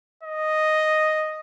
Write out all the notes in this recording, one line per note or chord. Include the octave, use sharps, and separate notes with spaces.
D#5